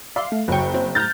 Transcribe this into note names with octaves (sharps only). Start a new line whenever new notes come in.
D5 E5 F5 C6
A3
F#1 D2 F#3 G5 C#6
F#3 C4
A2 A#5 F6 G6 A6